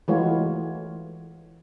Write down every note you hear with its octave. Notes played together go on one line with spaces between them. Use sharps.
E3 G#3 A3 F4 F#4 C#5